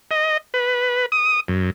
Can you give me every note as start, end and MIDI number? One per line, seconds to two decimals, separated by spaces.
0.11 0.37 75
0.54 1.06 71
1.12 1.40 87
1.48 1.71 42